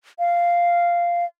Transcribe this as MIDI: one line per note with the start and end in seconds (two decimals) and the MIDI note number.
0.19 1.25 77